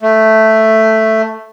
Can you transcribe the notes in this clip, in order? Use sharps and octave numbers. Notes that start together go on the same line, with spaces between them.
A3